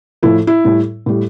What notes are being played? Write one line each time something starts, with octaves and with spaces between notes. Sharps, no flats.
A2 F3 A3 E4
E4
A2 G3
A2 G3